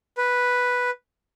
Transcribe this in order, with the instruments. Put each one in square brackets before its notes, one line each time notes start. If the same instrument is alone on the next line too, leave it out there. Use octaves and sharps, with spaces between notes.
[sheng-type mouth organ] B4